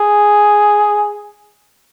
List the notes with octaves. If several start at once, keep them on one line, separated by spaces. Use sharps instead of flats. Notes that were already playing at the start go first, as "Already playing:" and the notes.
Already playing: G#4